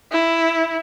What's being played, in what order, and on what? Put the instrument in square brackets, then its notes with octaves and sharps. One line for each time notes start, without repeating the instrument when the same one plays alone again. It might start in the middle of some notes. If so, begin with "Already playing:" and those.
[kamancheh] E4